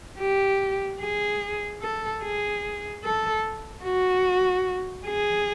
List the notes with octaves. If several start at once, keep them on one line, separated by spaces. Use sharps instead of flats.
G4
G#4
A4
G#4
A4
F#4
G#4